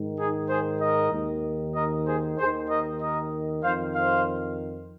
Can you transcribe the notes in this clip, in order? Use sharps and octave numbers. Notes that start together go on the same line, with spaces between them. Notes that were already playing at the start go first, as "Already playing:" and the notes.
Already playing: G#2 D#3
D#4 G#4
G#4 C5
A#4 D#5
D#2 D#3
A#4 D#5
G#4 C5
D#2 G#4 C5
D#3
A#4 D#5
A#4 D#5
F2 D#3 C5 F5
C5 F5